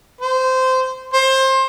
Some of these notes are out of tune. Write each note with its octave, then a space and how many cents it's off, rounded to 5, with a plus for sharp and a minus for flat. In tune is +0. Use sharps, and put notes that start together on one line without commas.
C5 -15
C5 +25